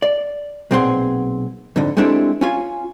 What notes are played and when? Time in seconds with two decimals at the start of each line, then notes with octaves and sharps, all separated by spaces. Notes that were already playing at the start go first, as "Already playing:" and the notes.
0.02 D5
0.71 B1 A#2 C4 G#4 F#5 C6
1.76 F2 G#2 D3
1.97 G#3 A3 C4 D4 E4 G4
2.41 C#4 F4 G#5